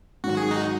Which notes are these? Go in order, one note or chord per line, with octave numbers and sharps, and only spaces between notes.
G#2 D#3 F#3 F#4
G#4
D#4 F#4